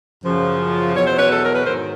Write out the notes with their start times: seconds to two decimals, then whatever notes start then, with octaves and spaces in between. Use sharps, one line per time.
0.24 F#2 C#3 F3
0.94 E2 B2 F#3 C#5
1.06 C5
1.18 B4 C#5
1.31 A4
1.42 A#4
1.53 B4
1.65 G#2 D#3 F#3 A#4 C5